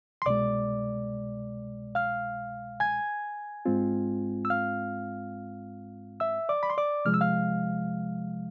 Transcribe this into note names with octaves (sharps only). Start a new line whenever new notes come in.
C6
C2 B2 G#3 D5 D6
F5 F6
G#5 G#6
G#2 G#3 C4 F4
E6
F5 F6
E5 E6
D5 D6
B5
C6
D5 D6
C3 F3 G#3 F6
E6
F5 F6